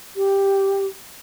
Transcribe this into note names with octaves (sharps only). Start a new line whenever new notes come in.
G4